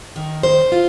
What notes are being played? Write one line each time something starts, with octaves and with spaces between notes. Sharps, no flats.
D#3
C5
F4